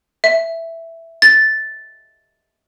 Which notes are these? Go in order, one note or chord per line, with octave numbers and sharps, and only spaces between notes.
E5
A6